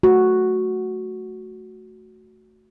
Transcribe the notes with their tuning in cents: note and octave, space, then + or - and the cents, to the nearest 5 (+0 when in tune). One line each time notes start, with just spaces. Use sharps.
A3 -5 F#4 +0